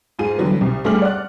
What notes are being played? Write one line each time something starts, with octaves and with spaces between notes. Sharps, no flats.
G#2 F4 G#4 D#7
D3 E3 F#3 G3 B3
C2
G2 G3 A3 G#4 F6 F#7
D5 F#5 F#6